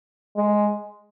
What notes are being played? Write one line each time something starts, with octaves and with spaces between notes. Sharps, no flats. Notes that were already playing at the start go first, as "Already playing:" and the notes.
G#3